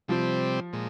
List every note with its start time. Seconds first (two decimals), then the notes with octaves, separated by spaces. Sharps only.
0.08 C3 F3 G3 C4
0.73 A#2 G#3